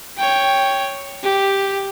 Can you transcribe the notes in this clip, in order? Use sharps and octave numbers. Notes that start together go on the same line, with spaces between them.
C#5 G5
G4